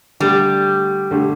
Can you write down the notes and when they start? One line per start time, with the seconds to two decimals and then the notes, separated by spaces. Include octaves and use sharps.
0.20 D3 G3 A3 G4
1.11 D3 A3 G4